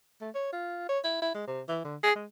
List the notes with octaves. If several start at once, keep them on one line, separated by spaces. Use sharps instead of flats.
A3
C#5
F4
C#5
E4
E4
G#3
C3
E3
D3
G#4
G#3